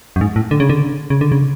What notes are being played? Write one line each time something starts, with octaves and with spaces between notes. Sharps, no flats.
F#2
G#2
A2
D3
C#3
D3
C#3
D3
C#3